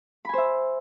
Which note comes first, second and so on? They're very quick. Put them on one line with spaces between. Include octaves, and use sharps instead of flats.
B5 G#5 C5 E5